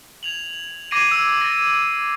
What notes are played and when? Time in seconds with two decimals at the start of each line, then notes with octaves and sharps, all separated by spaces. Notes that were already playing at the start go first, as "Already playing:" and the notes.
0.23 G#6 F7 F#7
0.91 D6 G#6 A#6 C7 D7 D#7
1.11 E6
1.41 A6 A#6